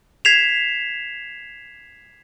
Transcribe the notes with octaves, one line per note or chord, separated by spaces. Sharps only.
G#6 B6 C7 E7 F7